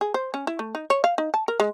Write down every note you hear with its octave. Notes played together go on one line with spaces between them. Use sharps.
G#4
C5
C#4
E4
A3
D#4
C#5
F5
D#4
A5
A#4
G#3